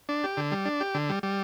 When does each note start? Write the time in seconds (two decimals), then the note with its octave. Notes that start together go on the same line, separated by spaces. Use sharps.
0.09 D4
0.24 G4
0.37 D3
0.52 G3
0.65 D4
0.80 G4
0.94 D3
1.09 G3
1.23 G3